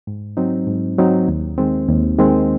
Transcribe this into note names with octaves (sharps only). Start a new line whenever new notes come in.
G#2
F#3 C4 D#4
G#2
F#3 C4 D#4
D#2
D#3 G#3 C4
D#2
D#3 G#3 C4